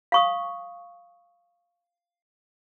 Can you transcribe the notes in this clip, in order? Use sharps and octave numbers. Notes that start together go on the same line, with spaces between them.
F5 C#6 D#6